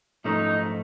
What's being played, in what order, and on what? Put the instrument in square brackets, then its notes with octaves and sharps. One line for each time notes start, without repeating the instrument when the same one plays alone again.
[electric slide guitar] G#2 F3 A3 C#4 [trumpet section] D#4